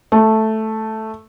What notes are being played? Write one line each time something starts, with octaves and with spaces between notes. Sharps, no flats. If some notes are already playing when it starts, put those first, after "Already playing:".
A3